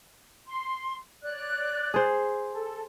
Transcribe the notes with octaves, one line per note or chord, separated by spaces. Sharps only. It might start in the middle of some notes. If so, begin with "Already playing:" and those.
C6
C#5 D5 F#6
G#4 C5
A4